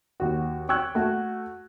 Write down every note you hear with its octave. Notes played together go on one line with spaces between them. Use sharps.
D#2 F#4
G5 C#6 E6 F#6 G#6
A3 F#4